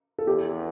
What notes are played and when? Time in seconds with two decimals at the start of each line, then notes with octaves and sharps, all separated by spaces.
0.18 A4
0.27 E2 G4